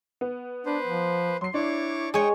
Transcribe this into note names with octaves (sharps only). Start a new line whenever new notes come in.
B3
D4 B4 C5
F3
F#3 C6 C7
D4 E4 C#5 C#6 D6
G#3 C#5 G5 C#6 D#6